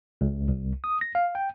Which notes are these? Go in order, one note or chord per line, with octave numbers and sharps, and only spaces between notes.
C#2
C2
D#6
A#6
F5
G5